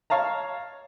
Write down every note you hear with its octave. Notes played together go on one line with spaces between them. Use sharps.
C#5 F5 A5 A#5